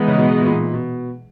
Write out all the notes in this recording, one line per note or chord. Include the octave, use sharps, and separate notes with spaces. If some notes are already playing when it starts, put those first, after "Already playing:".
Already playing: E3 G#3 B3 D#4
C#3
B2
B2
A#2
B2